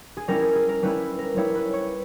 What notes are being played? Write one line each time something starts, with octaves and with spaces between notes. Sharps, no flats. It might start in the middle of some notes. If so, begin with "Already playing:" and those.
G#4
G3 C#4 E4 A#4
G#4
G#4
A#4
G3 C#4 E4 B4
A#4
G3 C#4 E4 C#5
B4
C#5